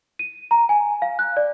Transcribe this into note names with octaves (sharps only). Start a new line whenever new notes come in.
D#7
A#5
G#5
F5
F#6
D5